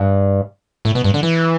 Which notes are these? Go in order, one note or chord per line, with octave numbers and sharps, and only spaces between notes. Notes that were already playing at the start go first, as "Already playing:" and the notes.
Already playing: G2
A2
B2
G2
D3
E3